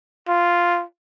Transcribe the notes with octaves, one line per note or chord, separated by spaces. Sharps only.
F4